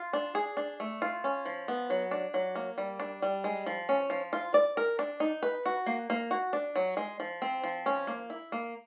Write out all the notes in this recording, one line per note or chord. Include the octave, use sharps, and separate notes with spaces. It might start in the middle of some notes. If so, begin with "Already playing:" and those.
Already playing: F4
D4
G#4
D4
A3
F4
C#4
F3
B3
F#3
D4
F#3
A#3
G3
D4
G3
G#3
F3
C#4
F3
F4
D5
A#4
D4
D#4
B4
F#4
A#3
A#3
F#4
D4
F#3
G#3
F3
C4
F3
C#4
A#3
E4
A#3